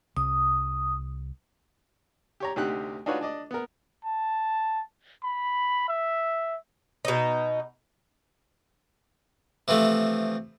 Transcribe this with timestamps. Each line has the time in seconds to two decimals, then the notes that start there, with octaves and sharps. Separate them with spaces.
0.17 C2 D#6
2.40 G4 C#5 A#5
2.56 D2 C3 D#4 G4 F#5 F#6
3.06 D4 D#4 F4 F#4 B4 C#5
3.21 D4 D5 D#5
3.51 B3 A#4
4.05 A5
5.24 B5
5.88 E5
7.05 B2 D#4
9.68 C3 E3 F3 A3